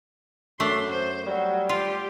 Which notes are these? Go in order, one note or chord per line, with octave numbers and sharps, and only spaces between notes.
F#2 A3 D4 C6
C5
F#3 G3
F4 G4